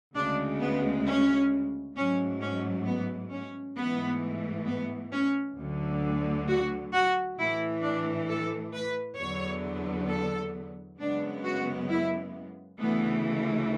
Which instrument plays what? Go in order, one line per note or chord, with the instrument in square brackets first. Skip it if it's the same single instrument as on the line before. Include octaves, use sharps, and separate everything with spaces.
[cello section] D2 C#3 G#3 D4
B3
C#4
G#2 F#3 A3 C#4
C#4
B3
C#4
G#2 E3 A3 B3
B3
C#4
D2 D3 F#3
F#4
F#4
A2 E3 A3 E4
D4
A4
B4
E2 D3 F#3 B3 C#5
A4
F#2 C#3 G#3 B3 D4
F#4
E4
D2 C#3 E3 A3 B3